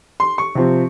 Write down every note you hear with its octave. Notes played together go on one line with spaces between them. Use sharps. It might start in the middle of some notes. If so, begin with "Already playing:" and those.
C6
C#6
C3 F3 C4